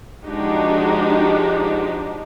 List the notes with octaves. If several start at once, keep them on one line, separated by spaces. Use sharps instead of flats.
F3 G#3 D4 D#4 F#4 G4